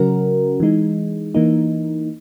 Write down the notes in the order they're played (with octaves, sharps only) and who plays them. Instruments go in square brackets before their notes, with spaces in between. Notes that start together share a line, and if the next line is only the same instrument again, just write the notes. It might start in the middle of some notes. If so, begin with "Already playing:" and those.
Already playing: [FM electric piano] C#3 F#3 C#4 F#4 A#4
E3 G#3 D#4
E3 A#3 D#4